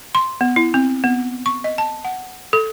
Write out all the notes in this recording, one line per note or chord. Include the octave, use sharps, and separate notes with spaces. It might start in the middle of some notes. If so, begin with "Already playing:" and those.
C6
B3
E4
C4
B3
C#6
D#5
A5
F#5
A4